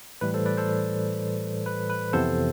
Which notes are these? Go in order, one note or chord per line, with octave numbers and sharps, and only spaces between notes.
A2 E3 G3 B4
A4 C5
B4 D5
A4 C5
B4
B4
F2 C3 E3 B3 A4 C5